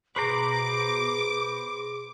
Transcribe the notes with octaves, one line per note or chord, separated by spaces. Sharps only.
B2 G#4 B4 C5 A#5 D6